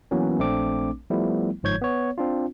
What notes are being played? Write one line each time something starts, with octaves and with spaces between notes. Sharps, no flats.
E3 F#3 A#3 B3 C#4
A#1 A3 C4 D4 D6
F3 G3 A3 B3 E4
G1 G#2 F3 C#5 G6 G#6
B3 C#5
C4 D4 F4